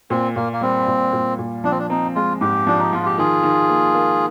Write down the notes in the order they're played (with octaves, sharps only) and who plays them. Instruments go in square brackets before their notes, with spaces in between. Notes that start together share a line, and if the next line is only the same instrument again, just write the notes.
[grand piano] A#2 [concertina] C4
[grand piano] A#2 [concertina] A#3
[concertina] A#3
[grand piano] G3 [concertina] C4
[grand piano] A#2
A#2
A#2
[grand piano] F3 [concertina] D4
[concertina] C4
D4
[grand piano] C4 [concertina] D#4
[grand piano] G#3 [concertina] F4
[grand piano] G#2 [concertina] G4
[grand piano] F3 [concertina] D4
[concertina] D#4
[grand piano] F3 [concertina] F4
[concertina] G4
[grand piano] D#3 [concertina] F4 G#4
[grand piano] D#3
A#3
A#3